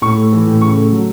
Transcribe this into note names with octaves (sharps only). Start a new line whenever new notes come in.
A2 C#6
A3
E3
A2
C#3 C#6
A3
F#3